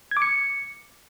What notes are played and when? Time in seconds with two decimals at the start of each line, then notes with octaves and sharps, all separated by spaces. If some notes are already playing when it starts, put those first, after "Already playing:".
0.11 G#6
0.17 D6
0.22 C#7